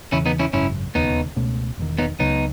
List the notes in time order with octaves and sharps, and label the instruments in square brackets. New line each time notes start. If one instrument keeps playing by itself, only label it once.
[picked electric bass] E1 E2 C#3 E3 [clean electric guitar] C#4 E4
[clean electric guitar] B3 D#4
C#4 E4
[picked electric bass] G#1 F#2 C#3 [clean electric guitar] C#4 E4
[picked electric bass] E1 D#2 C#3 [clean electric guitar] B3 D#4
[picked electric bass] C#2 B2 A3 C#4
E1 E2 D#3
[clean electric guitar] B3 D#4
[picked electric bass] C#2 C#3 F#3 [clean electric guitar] B3 D#4